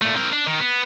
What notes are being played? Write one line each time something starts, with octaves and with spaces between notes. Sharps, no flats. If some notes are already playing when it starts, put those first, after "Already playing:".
A#2 A3
C4 A#4
D4
D#3
B3